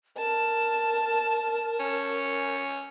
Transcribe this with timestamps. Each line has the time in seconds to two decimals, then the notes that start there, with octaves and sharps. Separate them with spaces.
0.17 A#4 A5
1.80 C#4